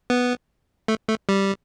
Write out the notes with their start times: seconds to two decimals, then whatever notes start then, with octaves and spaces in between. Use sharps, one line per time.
0.10 B3
0.88 A3
1.08 A3
1.29 G3